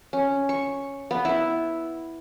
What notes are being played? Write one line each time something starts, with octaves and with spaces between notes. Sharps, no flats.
C#4
C#6
B3
E4